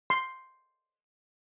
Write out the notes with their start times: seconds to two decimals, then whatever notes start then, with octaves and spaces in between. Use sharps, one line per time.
0.10 C6